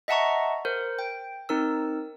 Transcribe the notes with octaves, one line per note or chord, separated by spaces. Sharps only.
D#5 E5 F#5 A5 A#5 C#6
A#4 C5
G5
C4 D#4 A#4 E6